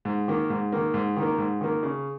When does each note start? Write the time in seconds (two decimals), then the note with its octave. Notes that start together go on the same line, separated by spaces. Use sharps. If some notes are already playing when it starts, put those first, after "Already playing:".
0.05 G#2
0.28 D#3 A#3
0.50 G#2
0.72 D#3 A#3
0.94 G#2
1.16 D#3 A#3
1.38 G#2
1.61 D#3 A#3
1.83 C#3